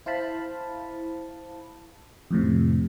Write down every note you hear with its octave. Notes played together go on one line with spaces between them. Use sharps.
E4 C5 F5 A5 B5
F2 A2 C3